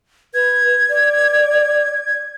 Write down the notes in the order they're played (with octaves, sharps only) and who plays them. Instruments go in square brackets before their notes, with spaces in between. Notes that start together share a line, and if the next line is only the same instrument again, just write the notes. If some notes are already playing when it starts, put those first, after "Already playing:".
[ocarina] B4 [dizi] G#6
[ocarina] D5